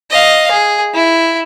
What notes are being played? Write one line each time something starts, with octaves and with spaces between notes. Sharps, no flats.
D#5 F5
G#4
E4